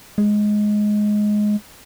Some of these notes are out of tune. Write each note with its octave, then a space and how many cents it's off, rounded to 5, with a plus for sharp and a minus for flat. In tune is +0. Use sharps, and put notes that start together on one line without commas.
G#3 +10